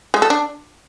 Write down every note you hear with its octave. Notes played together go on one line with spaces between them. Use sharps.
G#3
A4
D4